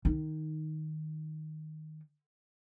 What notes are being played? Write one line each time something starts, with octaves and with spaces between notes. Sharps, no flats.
D#3 D#4